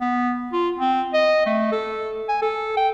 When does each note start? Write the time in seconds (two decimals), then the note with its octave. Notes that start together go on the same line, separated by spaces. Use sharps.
0.01 B3
0.53 F4
0.79 C4
1.14 D#5
1.46 A3
1.72 A4
2.29 G#5
2.42 A4
2.77 G5